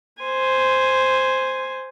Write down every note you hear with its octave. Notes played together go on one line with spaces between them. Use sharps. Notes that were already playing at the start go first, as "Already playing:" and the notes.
C5 G#5